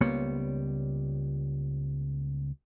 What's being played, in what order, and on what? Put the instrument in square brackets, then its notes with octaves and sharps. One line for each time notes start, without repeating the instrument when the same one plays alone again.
[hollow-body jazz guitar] C#2 G3 A#3 B3 C5 C#5